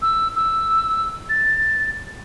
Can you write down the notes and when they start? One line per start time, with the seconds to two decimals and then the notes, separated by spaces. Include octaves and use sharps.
0.02 E6
0.36 E6
1.29 A6